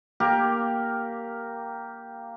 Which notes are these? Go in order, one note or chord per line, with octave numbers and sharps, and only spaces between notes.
A#3 G4 A#4